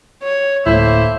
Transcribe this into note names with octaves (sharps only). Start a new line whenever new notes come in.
C#5
D1 A2 A3 A#3 E4 C5 E5